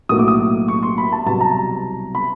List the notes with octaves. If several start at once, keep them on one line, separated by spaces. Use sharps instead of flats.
B1 A2 F#3 A#3 D#6
D6
D#6
C#6
C6
B5
A5
C2 B2 F#3 A5
A#5
B5